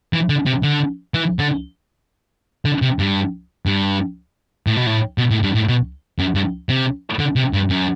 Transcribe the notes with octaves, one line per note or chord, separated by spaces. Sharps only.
E3
D3
C3
D3
E3
D3
D3
C3
G2
G2
A2
B2
A2
B2
A2
G2
A2
B2
F#2
G2
C3
D3
C3
G2
F#2